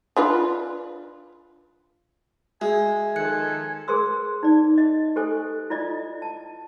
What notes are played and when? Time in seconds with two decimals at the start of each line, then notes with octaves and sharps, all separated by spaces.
0.17 D4 F4 B4
2.61 G#3 F#4 E5 G#5
3.16 D#3 F3 A4 F#6 C#7
3.88 G#4 A#4 C5 C6 E6
4.43 D#4 D5
4.78 D#5
5.16 G4 A4 C5 G#5
5.70 E4 F4 D5 D#5
6.22 A5